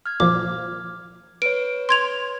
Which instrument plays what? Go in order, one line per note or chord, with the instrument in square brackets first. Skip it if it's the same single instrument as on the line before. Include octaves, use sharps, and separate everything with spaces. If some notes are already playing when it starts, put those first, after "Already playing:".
[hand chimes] F6 G#6
[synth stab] A#2 F3 [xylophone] D6
[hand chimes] B4 C#5 [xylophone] D7
[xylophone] C6 G#6 F7